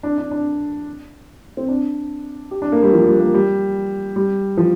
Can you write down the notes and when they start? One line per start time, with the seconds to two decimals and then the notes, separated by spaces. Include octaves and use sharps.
0.03 D4
0.18 D4
0.31 D4
1.57 C4
1.68 D4
2.51 G4
2.62 D4
2.72 A#3
2.83 G3
2.93 F3
3.06 G3
3.20 A#3
3.34 G3
4.16 G3
4.57 F3